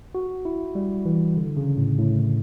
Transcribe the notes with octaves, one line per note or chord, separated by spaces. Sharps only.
F#4
E4
G3
E3
D3
C#3
A2
A2